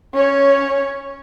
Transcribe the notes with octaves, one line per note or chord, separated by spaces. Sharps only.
C#4 C#5